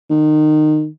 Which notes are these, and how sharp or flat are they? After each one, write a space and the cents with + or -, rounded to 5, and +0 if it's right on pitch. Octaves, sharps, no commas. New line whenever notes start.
D#3 -25